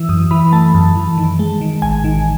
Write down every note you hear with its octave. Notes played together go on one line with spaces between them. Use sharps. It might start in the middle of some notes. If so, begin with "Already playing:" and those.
Already playing: E3 E6
F#2 D#6
E3 B5
A3 A5
F#2
E3
D#3
G#3
D#3
A1 G#5
D#3